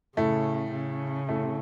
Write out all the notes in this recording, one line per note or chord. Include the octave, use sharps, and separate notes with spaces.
A2 C#3 A3
C#3
A2 A3